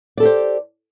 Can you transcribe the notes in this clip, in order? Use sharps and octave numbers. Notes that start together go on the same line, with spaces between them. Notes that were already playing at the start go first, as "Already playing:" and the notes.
G4 A4 C5 D5